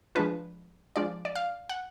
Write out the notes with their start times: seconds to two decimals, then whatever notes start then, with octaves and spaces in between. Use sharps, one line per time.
0.15 F3 G#3 D4 F4 B4
0.96 F3 G#3 D4 F4 D5
1.25 D5
1.36 F5
1.69 F#5